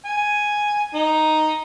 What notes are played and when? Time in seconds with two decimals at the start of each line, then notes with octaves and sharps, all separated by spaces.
0.06 G#5
0.95 D#4